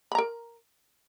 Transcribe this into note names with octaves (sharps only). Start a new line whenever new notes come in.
A#4 A#5 B5